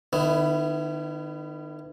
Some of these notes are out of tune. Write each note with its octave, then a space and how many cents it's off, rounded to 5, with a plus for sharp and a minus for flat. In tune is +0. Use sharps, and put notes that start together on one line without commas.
D#3 -40 B3 +25 E4 +5